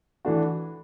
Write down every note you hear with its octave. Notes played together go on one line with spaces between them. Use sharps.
E3 A3 D4 F#4